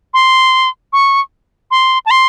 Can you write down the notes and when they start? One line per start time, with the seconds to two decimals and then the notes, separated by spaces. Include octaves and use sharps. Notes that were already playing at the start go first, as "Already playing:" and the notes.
0.14 C6
0.93 C#6
1.71 C6
2.06 A5
2.11 C6